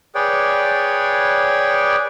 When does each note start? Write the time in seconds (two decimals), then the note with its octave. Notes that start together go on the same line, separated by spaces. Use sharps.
0.15 G#4 B4 C#5 D5 G5